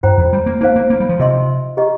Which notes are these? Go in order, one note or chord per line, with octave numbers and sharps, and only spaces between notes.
G2 F4 C5 G5 A#5
F2
G3
A#3
A#3 D#4 C5 F5
A#3
A#3
G3
F3
C3 F4 D#5 C6
G4 D#5 A#5